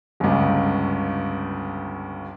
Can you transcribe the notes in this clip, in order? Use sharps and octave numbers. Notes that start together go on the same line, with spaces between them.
G1 C#2